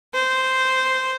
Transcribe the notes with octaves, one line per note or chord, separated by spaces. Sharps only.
C5